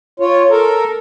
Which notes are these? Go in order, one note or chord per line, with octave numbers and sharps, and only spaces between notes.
F4 C#5
A4 A#4